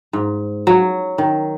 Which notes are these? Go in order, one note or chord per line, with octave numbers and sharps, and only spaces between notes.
G#2
F#3
D#3